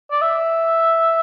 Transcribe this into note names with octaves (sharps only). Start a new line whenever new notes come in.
D5
E5